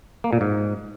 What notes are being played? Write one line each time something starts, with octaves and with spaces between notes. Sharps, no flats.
A#3
A#2
G#2